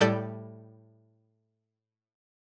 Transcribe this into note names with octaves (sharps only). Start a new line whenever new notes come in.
A2 G3 A4 D5 G6